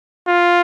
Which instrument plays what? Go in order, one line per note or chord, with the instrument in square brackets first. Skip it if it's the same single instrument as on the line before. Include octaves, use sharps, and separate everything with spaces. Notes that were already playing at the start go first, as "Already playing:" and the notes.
[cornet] F4